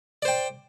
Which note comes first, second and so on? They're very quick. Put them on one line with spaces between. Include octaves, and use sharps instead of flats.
D5 C5 G5